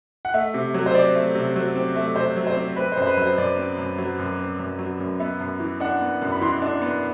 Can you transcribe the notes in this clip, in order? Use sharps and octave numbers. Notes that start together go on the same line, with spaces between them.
F#5
A3 E5
C3
F#3
C5
C4 D5
A3
C3
F#3
C4
A3
C3 C5
F#3
C5
C4
C4 B4
C5
F#2
C5
B4
F#3 C5
F#2 D5
C4
F#2
F#3
F#2
C4
F#2
F#3
F#2
B3 E5
F#2
E3
D4 F#5
B3
F#2
B5
E3 C6
D4
B3